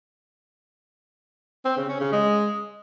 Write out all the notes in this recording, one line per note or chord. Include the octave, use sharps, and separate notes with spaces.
C4
C#3
C#4
C#3
G#3